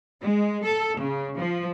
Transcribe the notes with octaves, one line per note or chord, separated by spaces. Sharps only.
G#3
A4
C#3
F3